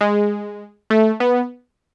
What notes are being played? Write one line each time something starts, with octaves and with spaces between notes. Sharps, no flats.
G#3
A3
B3